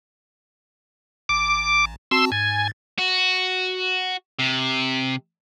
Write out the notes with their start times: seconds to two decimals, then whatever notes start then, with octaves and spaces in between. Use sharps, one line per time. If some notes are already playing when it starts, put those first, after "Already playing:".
1.29 A1 D6
2.11 C4 F#4 A5 C6 E6
2.32 G#2 G#5 A6
2.98 F#4
4.39 C3